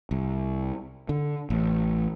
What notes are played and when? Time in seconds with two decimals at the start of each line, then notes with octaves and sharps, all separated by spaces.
0.11 C2
1.09 D3
1.50 A1